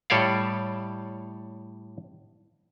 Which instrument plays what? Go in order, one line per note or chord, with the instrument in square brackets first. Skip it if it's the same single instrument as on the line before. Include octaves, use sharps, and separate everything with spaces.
[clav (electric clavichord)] A2 G3 A4 C#5 D5 F5